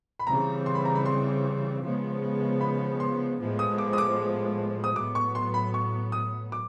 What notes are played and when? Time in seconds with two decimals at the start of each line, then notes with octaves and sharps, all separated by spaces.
0.19 B5
0.27 C#3 E3 G3 C4 A#5
0.66 C6
0.75 B5
0.85 A#5
0.95 B5
1.05 C6
1.83 C#3 F3 G#3 B3
2.61 B5
3.00 C6
3.40 A2 F3 G#3 B3
3.59 D#6
3.78 D6
3.93 D#6
3.98 D6
4.84 D#6
4.96 A2 F#3 B3 D6
5.15 C#6
5.35 C6
5.54 B5
5.74 C#6
6.12 D#6
6.52 D6